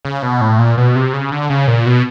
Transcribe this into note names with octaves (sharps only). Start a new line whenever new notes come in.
C#3
B2
A2
A#2
B2
C3
C#3
D3
C#3
A#2
B2